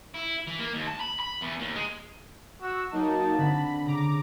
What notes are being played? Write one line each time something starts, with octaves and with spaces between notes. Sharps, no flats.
E4
E3
A#3
D#2
A5
B5
B5
E2
D#2
G#3
F#4 E6
F#3 A#3 D#4 A5
D3 C4 B5
C#3 A#5 D6